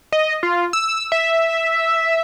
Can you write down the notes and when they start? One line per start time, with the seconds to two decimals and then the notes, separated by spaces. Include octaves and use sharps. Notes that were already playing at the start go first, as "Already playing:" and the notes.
0.12 D#5
0.43 F4
0.73 E6
1.12 E5